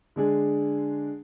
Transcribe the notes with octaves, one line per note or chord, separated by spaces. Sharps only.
D3 G#3 D4 G#4